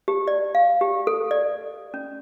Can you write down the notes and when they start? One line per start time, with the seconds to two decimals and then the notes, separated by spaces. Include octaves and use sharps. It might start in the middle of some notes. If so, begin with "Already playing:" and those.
0.08 G4
0.28 D5
0.55 F5
0.81 G4
1.07 A4
1.31 D5
1.94 C#4